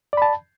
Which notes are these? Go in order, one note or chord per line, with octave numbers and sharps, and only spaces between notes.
D5 A5 B5